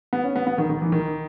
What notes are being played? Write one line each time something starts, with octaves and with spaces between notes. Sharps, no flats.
B3
C#4
B3
B3
D#3
D#3
E3
D#3